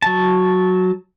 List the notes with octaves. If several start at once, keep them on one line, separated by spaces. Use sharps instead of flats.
F#3 A5